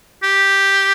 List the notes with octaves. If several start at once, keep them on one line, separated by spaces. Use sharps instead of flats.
G4